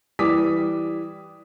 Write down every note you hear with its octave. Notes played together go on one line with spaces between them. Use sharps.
E3 G3 D6 D#6 B6